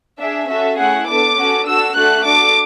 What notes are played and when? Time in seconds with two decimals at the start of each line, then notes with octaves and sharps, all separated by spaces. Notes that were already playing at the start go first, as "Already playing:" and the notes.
0.19 D4 G#4 E5
0.49 C#4 F#4 A4 E5
0.78 A3 C#4 E4 G#4 F#5
1.08 B3 D4 A4 D6
1.37 C#4 F#4 A4
1.67 D4 F#4 A4 E6
1.96 A3 D4 F#4 A4 F#6
2.25 D4 F#4 A4 D6